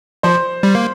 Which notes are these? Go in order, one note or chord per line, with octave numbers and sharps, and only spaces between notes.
F3 C5
G3
A#3